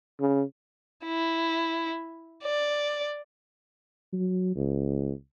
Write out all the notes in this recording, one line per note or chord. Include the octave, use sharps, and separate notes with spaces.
C#3
E4
D5
F#3
C#2